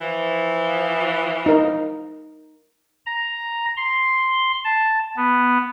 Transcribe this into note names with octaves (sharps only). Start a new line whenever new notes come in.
E3 F3
D#4 A#4
A#5
C6
A5
B3